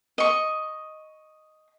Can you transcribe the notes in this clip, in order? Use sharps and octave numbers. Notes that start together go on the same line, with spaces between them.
D#5 C#6